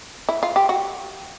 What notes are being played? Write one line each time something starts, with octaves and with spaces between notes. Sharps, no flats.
E4
F4
G4
F#4